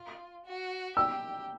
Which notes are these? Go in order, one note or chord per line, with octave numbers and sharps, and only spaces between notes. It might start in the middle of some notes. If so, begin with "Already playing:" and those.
Already playing: F4
F#4
G4 E6